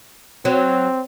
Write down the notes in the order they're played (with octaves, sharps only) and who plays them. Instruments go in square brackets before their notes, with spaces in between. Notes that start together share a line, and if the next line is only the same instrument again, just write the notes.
[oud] F#3 [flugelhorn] C4